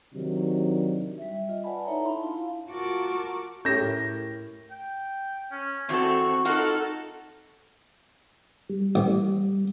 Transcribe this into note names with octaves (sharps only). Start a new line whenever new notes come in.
C3 D#3 F#3 D4 D#4
G3 E5
F4 D#5
B4 D5 F#5 G#5 A5 B5
D#4 E4 A4 C#5 E5 A#5
D4 E4 A5 B5 C6
E4 F4 F5
F4 F#4 A#4 A5 D6
A3 C#4 E4 G4 G#4 G6 A#6 E7
A2 A#4
G5
C#4
E2 C4 F#4 A4 C#6
D#4 F4 F#4 A4 A#4 F#5
G3
A1